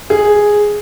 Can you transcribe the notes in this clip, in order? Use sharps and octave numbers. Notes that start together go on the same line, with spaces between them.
G#4